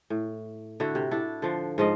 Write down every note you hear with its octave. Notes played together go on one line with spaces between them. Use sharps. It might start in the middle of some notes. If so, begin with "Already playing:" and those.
A2
D3 E4 F#4
C3
D4 E4 A4
D3 F3
G#2 F3 D#5